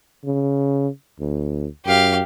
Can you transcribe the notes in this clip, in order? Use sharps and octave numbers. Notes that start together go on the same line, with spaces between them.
C#3
D2
F#2 G4 F5